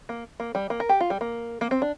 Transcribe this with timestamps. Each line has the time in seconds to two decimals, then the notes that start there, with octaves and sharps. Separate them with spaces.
0.09 A#3
0.40 A#3
0.55 G3
0.70 A#3
0.80 A#4
0.89 G4
1.00 F4
1.10 G3
1.21 A#3
1.61 A#3
1.71 C4
1.82 D4